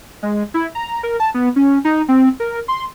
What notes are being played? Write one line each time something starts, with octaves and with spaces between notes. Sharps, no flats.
G#3
E4
A#5
A#4
A5
B3
C#4
D#4
C4
A#4
C6